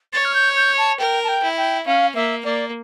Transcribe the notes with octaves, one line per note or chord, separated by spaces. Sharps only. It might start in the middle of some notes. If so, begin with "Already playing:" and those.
C#5 A6
F6
G6
G6
A5
A#4 G5
A5
G5
E4
G5
C#4 F5
A#3 E5
A#3 D5